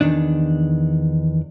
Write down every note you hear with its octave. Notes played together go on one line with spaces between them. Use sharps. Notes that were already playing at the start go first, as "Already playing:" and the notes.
E2 D#3 D4